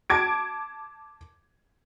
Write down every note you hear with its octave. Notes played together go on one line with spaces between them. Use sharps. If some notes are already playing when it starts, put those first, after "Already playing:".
A5 D6 G#6 D7